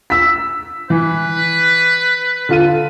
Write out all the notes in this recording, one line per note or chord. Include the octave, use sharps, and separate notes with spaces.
E6 B6
E3 B4
D3 F4 D#7